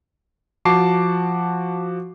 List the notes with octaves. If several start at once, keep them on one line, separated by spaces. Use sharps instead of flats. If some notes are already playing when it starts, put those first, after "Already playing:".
F3 F#4 A5 D6 C7